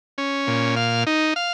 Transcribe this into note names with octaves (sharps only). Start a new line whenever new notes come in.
C#4
A#2
F5
D#4
F5